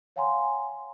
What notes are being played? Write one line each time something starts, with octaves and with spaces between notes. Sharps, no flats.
C#5 F5 F#5 G#5 A#5 C6